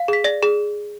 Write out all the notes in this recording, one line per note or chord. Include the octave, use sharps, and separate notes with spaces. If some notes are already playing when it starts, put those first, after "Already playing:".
Already playing: F5
G#4 B6
D5 A#6
G#4